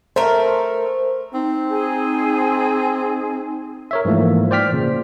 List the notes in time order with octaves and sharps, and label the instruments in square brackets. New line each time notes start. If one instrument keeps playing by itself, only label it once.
[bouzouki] A3 A#4 [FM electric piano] C5
[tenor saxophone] C4 [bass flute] D#4
[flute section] G#4
[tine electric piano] A#4 C#5 E5
G#2 E3 F3 A3 A#3
C5 D5 G5 F6 B6
A#2 C#3